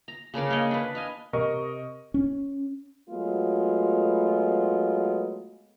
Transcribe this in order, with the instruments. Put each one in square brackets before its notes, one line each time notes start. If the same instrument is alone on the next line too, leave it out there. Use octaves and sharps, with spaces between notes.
[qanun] A#5
C#3 D4 A#4 D5
A#3 C#5 D#5
D4 B4
D#5 F5 G#5
[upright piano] C3 A#4 D#5 C#6
[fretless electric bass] C#4
[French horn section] F#3 G#3 A3 B3 F4